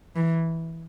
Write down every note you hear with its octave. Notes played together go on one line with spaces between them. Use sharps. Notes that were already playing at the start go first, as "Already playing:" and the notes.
E3